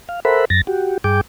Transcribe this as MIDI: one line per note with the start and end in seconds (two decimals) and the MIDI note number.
0.09 0.20 77
0.25 0.45 69
0.25 0.45 70
0.25 0.45 72
0.25 0.45 76
0.25 0.45 78
0.25 0.45 83
0.50 0.61 42
0.50 0.61 93
0.50 0.61 94
0.67 0.98 66
0.67 0.98 67
1.04 1.21 43
1.04 1.21 68
1.04 1.21 79
1.04 1.21 86